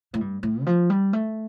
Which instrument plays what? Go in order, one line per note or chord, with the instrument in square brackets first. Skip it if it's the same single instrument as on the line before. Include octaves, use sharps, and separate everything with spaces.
[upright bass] A2
G2
A2
D#3
F3
G3
A3